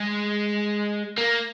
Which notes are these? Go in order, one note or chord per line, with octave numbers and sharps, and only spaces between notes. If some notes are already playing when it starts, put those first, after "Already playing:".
Already playing: G#3
A#3